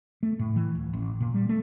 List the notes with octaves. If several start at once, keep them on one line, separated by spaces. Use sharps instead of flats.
A3
A2
E3
D1
A1
A#2
G3
A3